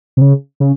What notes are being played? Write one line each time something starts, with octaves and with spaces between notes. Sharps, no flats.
C3
C#3
C#3